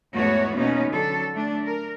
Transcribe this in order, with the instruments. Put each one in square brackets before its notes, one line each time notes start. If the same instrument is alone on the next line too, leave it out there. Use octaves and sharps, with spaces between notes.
[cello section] E2 G#2 A3 B3 F#4 C#5
B2 A#3 B3 C#4 D#4
D3 F#3 A4
A3 D4
A#4